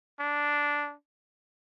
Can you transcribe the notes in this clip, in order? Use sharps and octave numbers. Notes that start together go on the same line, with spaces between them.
D4